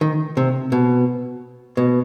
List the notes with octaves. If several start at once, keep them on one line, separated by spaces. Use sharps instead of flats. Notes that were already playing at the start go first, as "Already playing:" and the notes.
D#3
C3
B2
B2